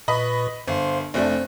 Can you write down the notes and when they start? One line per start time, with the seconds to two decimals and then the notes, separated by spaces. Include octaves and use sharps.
0.08 A#2 B4 D#5 B5 C#6
0.68 G1 C5 F5 C6
1.14 F1 A3 C4 D4 C5 D5